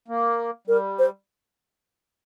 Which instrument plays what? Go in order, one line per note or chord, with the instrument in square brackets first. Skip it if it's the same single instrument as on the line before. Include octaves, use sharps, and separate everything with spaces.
[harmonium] A#3
[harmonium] G3 [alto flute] A#4
[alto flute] C5